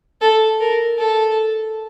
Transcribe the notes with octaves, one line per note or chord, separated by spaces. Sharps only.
A4
A#4
A4